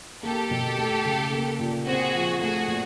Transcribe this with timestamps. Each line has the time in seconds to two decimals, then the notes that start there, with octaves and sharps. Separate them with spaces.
0.23 A#3 G4 A4
0.51 B2
0.79 A3
1.05 C#3
1.32 A#3
1.59 A#2
1.87 C4 F#4 G#4
2.14 F3
2.40 A3 F#4 G#4
2.68 A#2